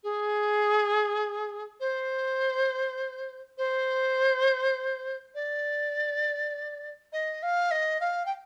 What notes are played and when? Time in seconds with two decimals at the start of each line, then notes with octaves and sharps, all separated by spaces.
0.04 G#4
1.80 C5
3.58 C5
5.35 D5
7.13 D#5
7.43 F5
7.71 D#5
8.01 F5
8.26 G5